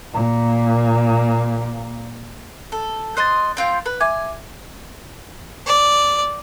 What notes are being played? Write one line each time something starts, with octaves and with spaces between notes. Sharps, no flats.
A#2 A#3
A4
C5 D#5 C6 F#6 A6
C4 F4 G5
B4
E5 G#5 D6 G#6
D5